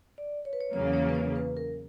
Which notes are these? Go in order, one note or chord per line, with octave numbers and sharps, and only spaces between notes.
D5
C#5
B4
C#5
E2 C#3 F#3 A#3 C#5
C#5
B4
C#5
B4
A#4